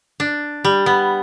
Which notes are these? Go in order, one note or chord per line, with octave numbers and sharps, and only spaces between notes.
D4
G3
B3